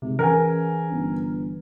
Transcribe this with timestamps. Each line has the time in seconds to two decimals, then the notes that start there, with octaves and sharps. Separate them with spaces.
0.02 G#1 C3
0.19 C#3 E3 A#4 G#5
0.91 G1